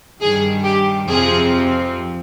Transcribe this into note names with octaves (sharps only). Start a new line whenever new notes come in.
G2 D#3 G3 G#4
G4
F2 C3 F3 C4 G#4